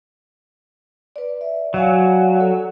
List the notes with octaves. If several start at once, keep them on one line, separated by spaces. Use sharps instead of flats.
B4 D5
D5 E5
F#3 D5 F5 G#5
A4